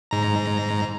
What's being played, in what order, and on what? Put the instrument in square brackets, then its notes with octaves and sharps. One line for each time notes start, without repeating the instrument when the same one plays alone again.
[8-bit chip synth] G#2 A#5